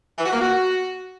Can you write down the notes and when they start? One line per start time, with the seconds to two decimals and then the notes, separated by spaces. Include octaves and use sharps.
0.19 E3
0.26 F#4
0.33 A#3
0.41 F#4